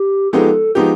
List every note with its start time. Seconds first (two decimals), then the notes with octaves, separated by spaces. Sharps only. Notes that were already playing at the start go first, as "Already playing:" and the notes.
Already playing: G4
0.33 F3 G#3 B3 D#4 G4 A4
0.75 F3 G#3 B3 D#4 G4